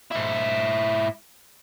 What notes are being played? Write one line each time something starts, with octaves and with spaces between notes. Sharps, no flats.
G#2 E4